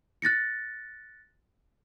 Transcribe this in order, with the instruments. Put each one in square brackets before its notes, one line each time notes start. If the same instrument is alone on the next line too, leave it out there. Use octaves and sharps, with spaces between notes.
[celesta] F#6 A6 A#6 C#7